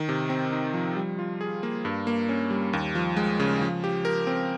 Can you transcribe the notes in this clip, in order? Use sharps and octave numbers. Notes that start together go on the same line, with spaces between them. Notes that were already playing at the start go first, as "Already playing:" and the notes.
Already playing: D#3
C3
C4
D#4
F3
G3
F4
G#4
A#3
G2
A#3
C#4
G3
D#2
F3
G#3
C#3
F3
G4
A#4
C4